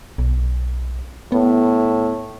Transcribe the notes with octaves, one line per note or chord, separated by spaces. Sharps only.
B1
A2 B3